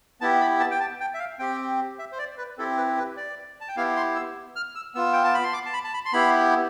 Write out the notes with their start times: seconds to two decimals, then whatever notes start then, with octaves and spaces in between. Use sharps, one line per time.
0.21 B3 E4 G4 A5
0.41 B5
0.60 A5
0.71 G5
0.80 A5
1.00 G5
1.14 E5
1.19 F5
1.39 C4 G4 G5
1.99 E5
2.12 C5
2.19 D5
2.38 B4
2.58 C4 E4 G4 A4
2.77 B4
2.98 B4
3.17 D5
3.61 A5
3.68 G5
3.77 B3 E4 G4 F5
3.96 C6
4.15 E6
4.56 F6
4.75 E6
4.95 B3 F4 E6
5.13 G5
5.24 A5
5.34 B5
5.44 C6
5.53 D6
5.66 A5
5.73 B5
5.84 A5
5.94 B5
6.05 C6
6.13 B3 E4 G4 B5